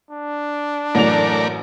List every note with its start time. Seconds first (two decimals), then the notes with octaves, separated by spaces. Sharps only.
0.10 D4
0.95 A1 F#2 A3 A#4 D5 F7